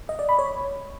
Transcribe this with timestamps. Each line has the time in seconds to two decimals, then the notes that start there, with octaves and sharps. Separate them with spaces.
0.09 D#5
0.19 D5
0.29 B5
0.39 C#5